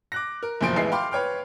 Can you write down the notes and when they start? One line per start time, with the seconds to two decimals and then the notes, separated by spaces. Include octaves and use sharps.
0.12 D6 F#6 A#6
0.43 A#4
0.61 F#1 E2 A#2 F3 C6 D7
0.76 A1 E3 G#3 B3 E5 C7
0.92 F5 G5 B5 C6 D6 F6
1.11 B4 C#5 G5 F6